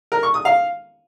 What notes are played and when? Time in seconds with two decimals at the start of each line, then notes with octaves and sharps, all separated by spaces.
0.12 A#4
0.23 C#6
0.34 D#6
0.45 F5